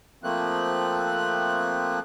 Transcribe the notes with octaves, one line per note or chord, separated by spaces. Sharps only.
F3 A3 A#3 C4 F#6